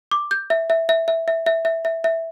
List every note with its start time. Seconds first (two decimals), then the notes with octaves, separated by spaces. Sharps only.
0.11 D6
0.31 G6
0.50 E5
0.70 E5
0.89 E5
1.08 E5
1.28 E5
1.46 E5
1.65 E5
1.85 E5
2.04 E5